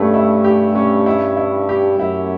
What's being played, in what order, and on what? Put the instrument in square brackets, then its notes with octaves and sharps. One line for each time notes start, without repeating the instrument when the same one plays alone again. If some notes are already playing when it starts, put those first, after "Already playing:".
Already playing: [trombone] G2 [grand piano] A3 C#4
[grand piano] E4
G4
C#4
E4
E4
G4
[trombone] F#2 [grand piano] E4